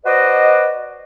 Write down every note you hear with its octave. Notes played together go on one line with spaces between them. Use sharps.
F#4 B4 C5 D5 D#5